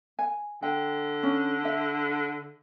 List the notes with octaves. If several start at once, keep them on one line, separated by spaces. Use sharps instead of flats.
G#5
D3 G5
C#4
E5